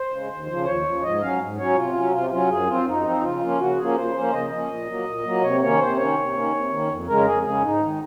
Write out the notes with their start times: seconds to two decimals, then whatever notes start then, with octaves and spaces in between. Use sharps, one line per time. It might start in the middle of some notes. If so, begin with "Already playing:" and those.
Already playing: C5
0.10 C#3 G#3
0.29 D#2
0.47 C#3 F3
0.65 D#2 C#5
0.84 C#3 F3
1.02 G#2 D#5
1.21 F#3 C#4 F5
1.39 G#2
1.57 F#3 C#4 C#5
1.75 C3 F4
1.93 F#3 C#4
2.11 C3 F4
2.30 F#3 C#4 F4
2.49 F#2 G#4
2.67 F3 C4 F4
2.85 F#2 D#4
3.03 F3 C4
3.21 C#3 F4
3.41 F3 A#3 C#4
3.59 C#3 F#4
3.77 F3 A#3 C#4 G#4
3.95 C#3 C5
4.14 F3 A#3 C#4
4.32 C#3 D#5
4.50 F3 A#3 C#4 D#5
4.69 A#2
4.87 F#3 A#3
5.05 A#2
5.24 F#3 A#3
5.41 C3 C#5
5.61 D#3 A#3 C#4 C#5
5.78 C3 C5
5.97 D#3 A#3 C#4 C#5
6.16 C3
6.33 D#3 A#3 C#4
6.52 C3
6.70 D#3 A#3 C#4
6.88 F2
7.07 C#3 G#3 C#4 A#4
7.25 F2 G#4
7.43 C#3 G#3 C#4 G#4
7.61 G#2 D#4
7.80 D#3 G#3